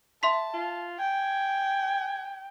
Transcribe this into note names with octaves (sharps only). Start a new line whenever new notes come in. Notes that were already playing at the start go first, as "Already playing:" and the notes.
E5 A5 C6 B6
F4
G5 G#5